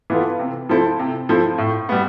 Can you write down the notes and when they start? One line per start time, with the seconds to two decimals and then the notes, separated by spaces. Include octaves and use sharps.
0.10 E3 B3 F4 A4
0.39 C3
0.69 F3 C4 E4 A4
0.99 C3
1.29 F3 C4 E4 A4
1.58 A2
1.89 G3 B3